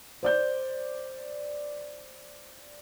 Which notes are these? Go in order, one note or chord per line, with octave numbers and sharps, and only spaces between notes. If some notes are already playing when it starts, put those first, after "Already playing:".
C5 D5 G6